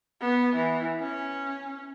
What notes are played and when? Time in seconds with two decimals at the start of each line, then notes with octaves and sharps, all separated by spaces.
0.22 B3
0.56 E3
1.00 C#4